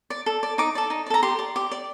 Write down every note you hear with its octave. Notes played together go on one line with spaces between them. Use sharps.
D5
A4
D5
D#4 D6
A4 D5
D#4
D5
A4 A#5
G4 C6
D5
G4 D6
D5